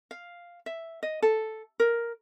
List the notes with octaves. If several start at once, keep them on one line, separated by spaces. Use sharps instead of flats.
F5
E5
D#5
A4
A#4